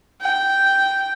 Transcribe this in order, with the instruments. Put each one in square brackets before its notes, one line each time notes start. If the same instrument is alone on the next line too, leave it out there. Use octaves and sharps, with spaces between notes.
[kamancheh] G5